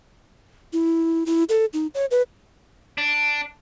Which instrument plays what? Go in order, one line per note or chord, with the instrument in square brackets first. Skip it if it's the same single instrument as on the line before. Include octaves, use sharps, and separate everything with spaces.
[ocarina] E4
E4
A4
D#4
C#5
B4
[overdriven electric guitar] D4